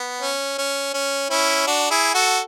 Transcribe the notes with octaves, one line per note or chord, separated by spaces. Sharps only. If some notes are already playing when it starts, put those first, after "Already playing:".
Already playing: B3
C#4
C#4
C#4
C#4 E4
D4 F#4
E4 G#4
F#4 A4